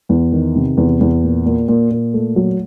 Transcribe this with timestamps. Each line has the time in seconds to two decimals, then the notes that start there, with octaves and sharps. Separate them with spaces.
0.09 E2
0.32 D#3
0.56 C3
0.77 E2
1.01 E2
1.24 A#2
1.46 A#2
1.68 A#2
1.91 A#2
2.14 A3
2.36 F#3